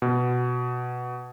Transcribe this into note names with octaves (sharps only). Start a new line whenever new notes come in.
B2